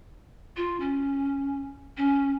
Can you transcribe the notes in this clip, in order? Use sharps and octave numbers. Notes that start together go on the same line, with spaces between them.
F4
C#4
C#4